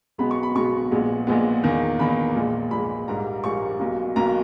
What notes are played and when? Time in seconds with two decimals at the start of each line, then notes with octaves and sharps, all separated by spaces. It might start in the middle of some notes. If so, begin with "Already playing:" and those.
0.18 B1 B2 G#3 B3 B5
0.31 C#6
0.43 B5
0.55 B1 B2 G#3 B3 C#6
0.91 A#1 A#2 G#3 B3
1.27 A#1 A#2 G#3 B3
1.63 E2 D#3 A#3
1.99 E2 D#3 A#3 B5
2.36 A#1 A#2 G#3
2.71 A#1 A#2 G#3 B5
3.07 A#1 G#2 G3 A#3 A#5
3.44 A#1 G#2 G3 A#3 C#6
3.79 B1 B2 A#3
4.16 B1 B2 A#3 A#5